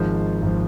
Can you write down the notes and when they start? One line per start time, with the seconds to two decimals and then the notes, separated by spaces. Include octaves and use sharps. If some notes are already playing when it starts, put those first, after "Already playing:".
Already playing: G#1 G#2 F3 C5
0.42 G#1 F3